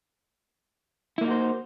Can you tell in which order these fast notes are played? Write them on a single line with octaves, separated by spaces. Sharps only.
E4 A#3 D#4 F#4 C5